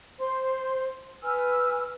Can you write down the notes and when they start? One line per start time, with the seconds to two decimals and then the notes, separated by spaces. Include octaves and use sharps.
0.19 C5 C6
1.22 B4 G#5 E6 F6